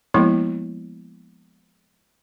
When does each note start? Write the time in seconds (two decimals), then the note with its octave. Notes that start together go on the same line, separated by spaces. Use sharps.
0.14 F3 G#3 A#3 B3 E4